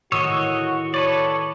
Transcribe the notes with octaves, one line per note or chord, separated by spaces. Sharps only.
A2 D#3 F#4 C#5 D#5 C#6 D#6 E6
A4 B4 C#5 D5